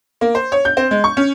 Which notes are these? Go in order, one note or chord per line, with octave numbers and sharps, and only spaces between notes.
A#3
C5
C#5
G6
C4
G#3
C#6
C#4